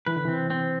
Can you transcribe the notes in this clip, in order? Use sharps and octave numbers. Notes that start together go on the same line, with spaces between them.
E3 B4
D3
C3 E3 C4
C4